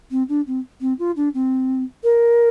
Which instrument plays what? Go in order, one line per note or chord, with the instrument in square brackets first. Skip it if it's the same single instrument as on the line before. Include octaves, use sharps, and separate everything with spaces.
[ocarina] C4
D4
C4
C4
F4
D4
C4
A#4